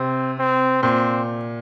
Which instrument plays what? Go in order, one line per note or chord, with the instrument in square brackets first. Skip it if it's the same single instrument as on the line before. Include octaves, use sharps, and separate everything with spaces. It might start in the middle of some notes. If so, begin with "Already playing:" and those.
Already playing: [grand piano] C3 [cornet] C4
[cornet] C4
[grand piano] A#2 [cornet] C4